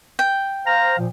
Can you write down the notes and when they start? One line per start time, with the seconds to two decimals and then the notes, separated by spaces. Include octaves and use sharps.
0.19 G5
0.66 C5 F5 A#5
0.98 A#2 F3